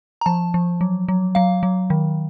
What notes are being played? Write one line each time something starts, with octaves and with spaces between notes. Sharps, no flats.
A#5
F3 A5
F3
F#3
F#3
F#3 F5
F#3
D#3